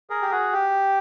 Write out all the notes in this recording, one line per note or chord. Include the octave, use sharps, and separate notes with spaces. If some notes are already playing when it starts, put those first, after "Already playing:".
G#4 A#4
G4
F#4 G#4
G4